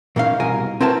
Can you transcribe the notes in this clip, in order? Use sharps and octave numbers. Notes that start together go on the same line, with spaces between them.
A#2 E3 A#3 C#4 D#4 F5
C2 B2 A#4 G#5
C4 E4 F#4 A#4 B4 A5